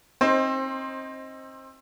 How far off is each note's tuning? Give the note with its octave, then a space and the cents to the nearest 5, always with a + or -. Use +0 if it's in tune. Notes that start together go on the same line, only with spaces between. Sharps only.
C4 +30 D#4 +15 C5 +15